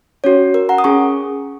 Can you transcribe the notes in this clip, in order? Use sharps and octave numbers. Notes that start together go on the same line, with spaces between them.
C#4 F#4 C#5
A#4
F#5 A#5
D#6
C#4 G#4 G#5 C#6